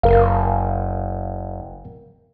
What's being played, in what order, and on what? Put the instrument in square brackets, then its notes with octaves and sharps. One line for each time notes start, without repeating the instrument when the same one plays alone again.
[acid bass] F#1 [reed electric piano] A#4 F5